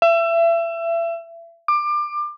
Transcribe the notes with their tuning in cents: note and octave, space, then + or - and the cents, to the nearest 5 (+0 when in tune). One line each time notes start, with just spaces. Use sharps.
E5 +30
D6 +25